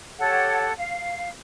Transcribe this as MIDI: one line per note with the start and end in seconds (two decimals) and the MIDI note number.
0.18 0.72 67
0.18 0.72 69
0.18 0.72 73
0.18 0.72 78
0.77 1.29 77